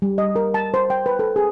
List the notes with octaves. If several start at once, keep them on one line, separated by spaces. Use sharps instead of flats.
G3
D#5
A#4
A5
C5
G5
B4
A4
G#4